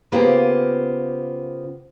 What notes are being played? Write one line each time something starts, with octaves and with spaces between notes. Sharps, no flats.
C#3 A#3 B3 F4 G4 C5